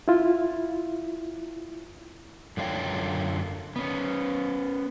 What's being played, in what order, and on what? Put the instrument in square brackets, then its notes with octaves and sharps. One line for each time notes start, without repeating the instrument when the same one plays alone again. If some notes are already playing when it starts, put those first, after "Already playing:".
[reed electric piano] E4 F4
[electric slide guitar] F#2 D3 F4 C#5 G5
B3 C#4